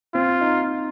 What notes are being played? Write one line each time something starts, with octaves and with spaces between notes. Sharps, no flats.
C4 F4
D#4